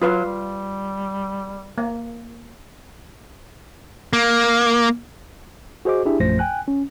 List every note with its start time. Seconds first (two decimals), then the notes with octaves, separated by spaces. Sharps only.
0.02 F#3 F4 B4 F5
0.25 G3
1.78 A#3
4.13 A#3
5.85 F#4 G#4 C5 D#5 D6
6.05 D4 E4 G4 G#4 E5
6.20 A#1 F#2 F3 A3 C5 A#6
6.39 G5 G#5 F#6
6.68 C#4